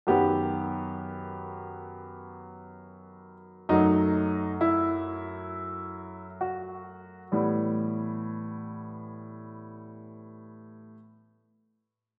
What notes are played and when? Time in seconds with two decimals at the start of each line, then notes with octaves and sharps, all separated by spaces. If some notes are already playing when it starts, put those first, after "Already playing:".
0.07 F#2 D#3 F#3 B3 G4
3.69 F#2 F#3 A3 D#4
4.61 E4
6.41 F#4
7.32 A2 E3 G3 B3